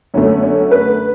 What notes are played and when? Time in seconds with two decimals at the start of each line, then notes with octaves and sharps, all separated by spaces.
0.14 F#2 D3 A3 C#4
0.42 C#4
0.71 B4